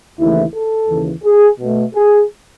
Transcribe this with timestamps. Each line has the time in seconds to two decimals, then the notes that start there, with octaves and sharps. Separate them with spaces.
0.19 D#2 C#3 E3 A3 E4
0.54 A4
0.89 D#2 C#3 E3
1.25 G#4
1.60 B2 A3
1.96 G#4